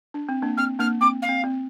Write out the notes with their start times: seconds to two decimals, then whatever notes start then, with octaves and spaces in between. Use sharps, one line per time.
0.14 D4
0.29 C4
0.42 A#3 D4
0.57 C4 F6
0.79 A#3 D4 F6
1.01 C4 D6
1.22 F5
1.29 C4
1.44 C4